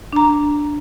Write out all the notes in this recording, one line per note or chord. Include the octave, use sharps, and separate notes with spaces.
D4 A#5